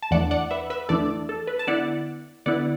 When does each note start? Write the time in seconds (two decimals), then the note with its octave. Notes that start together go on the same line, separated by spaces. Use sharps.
0.03 A5
0.11 E2 E3 A3 D4 D5 F#5
0.31 D5 F#5
0.51 B4 E5
0.70 B4 E5
0.89 E2 E3 A3 D4 A4 D5
1.29 A4
1.47 B4
1.59 A5
1.67 D3 B3 E4 D5 F#5
2.46 D3 B3 E4 D5 F#5